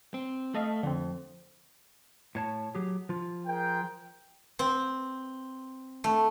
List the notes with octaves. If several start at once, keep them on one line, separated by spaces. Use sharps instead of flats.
C4
A3 A4 D#5 F5
F2 D3 C4
A2 C#5 A5
F#3 G4 G#4
F3 F4
G#4 A#4 G5
C4
A3